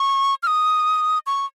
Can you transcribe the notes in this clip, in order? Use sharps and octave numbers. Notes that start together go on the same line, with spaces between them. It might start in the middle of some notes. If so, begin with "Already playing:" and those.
Already playing: C#6
F6
D#6
C#6